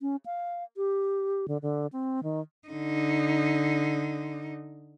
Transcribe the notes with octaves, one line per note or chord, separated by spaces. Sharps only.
C#4
F5
G4
D3
D3
C4
D#3
D3 D#4